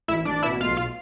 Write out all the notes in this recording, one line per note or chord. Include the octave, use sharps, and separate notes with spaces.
A1 E4 E5
A1 D4 D5
B2 E4 E5
B1 F4 F5
F4 F5